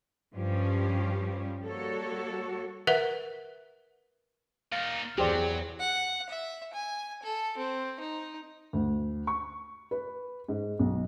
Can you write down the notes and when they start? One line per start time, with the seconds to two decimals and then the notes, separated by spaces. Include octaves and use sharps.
0.35 G2 F3 G3 C#4 G4
1.65 G3 A#3 F#4 A4 C#5
2.87 A#4 B4 E5 F#5
4.72 A#2 D#4 F5 F6 A6
5.18 E2 F#3 G4 G#4 C5 D5 A#6
5.80 F#5
6.30 E5
6.74 G#5
7.23 A4
7.58 C4
8.01 D#4
8.73 D2
9.27 C#6
9.91 B4
10.48 G#2
10.79 B1